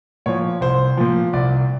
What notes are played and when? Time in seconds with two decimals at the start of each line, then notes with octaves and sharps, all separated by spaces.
0.26 A#2 F3 C#5
0.61 C2 C5
0.97 A#2 F3
1.33 C2 D5